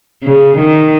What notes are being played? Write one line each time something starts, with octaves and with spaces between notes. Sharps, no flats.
C#3
D#3